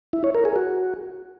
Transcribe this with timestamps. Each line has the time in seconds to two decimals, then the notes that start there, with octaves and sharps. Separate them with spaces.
0.13 E4
0.24 C#5
0.34 A#4
0.45 G#4
0.56 F#4